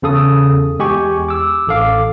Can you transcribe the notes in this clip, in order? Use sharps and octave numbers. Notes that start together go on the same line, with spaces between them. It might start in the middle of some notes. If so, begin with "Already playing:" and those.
E2 C#3 A4 D#6
E2 G#3 G4 G#5 C#6
D6 E6
A1 A4 F5 D6